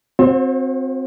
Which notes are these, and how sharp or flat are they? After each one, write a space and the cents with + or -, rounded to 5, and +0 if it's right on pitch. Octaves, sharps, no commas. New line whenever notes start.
C4 -5 F#4 -35 C5 +45